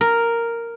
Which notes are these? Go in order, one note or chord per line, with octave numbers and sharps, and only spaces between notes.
A#4